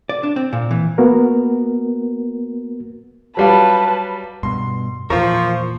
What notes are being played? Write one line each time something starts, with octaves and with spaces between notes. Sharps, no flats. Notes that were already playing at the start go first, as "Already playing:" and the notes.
D5
D4
C4
A#2
E3
A#3 B3 F#4 A#4
F#3 G3 F4 B4 A5
G2 B2 C6
E2 A#2 F3 F4 A#4 C5 C#6